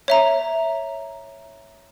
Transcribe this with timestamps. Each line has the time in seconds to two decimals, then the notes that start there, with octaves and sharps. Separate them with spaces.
0.08 C#5 E5 A#5